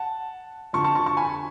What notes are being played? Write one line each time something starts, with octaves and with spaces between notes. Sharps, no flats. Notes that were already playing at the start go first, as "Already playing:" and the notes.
Already playing: F#5 A5
F2 D3 A5 C#6
A5 C#6
A5 C#6
A5 C#6
G#5 B5